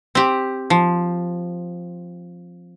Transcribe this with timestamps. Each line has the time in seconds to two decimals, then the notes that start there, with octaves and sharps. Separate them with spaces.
0.15 C4 G4
0.70 F3